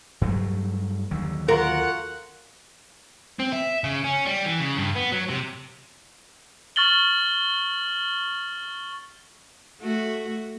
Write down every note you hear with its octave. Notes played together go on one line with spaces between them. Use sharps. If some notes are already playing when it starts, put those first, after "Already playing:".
G2 F#3 A3
D#2 D3 F#3
F4 F#4 A#4 F#5
C4
E5
C#3
C#4
G3
E3
C#3
G2
B3
F#3
C3
C#6 F6 A6 F#7 G7
A3 F#4